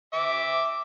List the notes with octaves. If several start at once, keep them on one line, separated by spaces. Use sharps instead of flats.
E5 D6